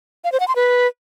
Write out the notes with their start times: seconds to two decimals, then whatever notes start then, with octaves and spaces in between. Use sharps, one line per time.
0.24 F5
0.32 C5
0.40 F#5
0.48 C6
0.56 B4